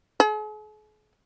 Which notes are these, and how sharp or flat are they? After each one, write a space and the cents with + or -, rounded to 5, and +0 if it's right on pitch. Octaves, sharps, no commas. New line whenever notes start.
G#4 +45